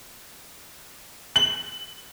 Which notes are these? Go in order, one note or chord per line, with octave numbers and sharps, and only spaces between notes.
F#7